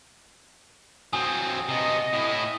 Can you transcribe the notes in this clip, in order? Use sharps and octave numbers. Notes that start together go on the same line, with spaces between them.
F#3 C4 G#5 D#6
C3 B3 D#5
A2 E4